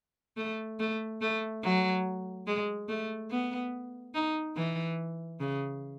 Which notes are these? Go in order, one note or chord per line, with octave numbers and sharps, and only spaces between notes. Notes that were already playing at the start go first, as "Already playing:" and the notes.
A3
A3
A3
F#3
G#3
A3
B3
D#4
E3
C#3